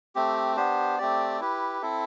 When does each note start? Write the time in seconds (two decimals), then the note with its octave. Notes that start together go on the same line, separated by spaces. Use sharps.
0.15 A3 C4 G4
0.56 B3 D4 G4 C5
0.98 A3 C4 G4 D5
1.40 E4 G4 B4
1.82 C4 E4 A4 E5